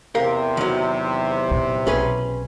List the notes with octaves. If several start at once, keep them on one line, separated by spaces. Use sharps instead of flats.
E2 C3 G4 A#4 F5
D#3 F#3
A#2
B1 C#4 G#4 B4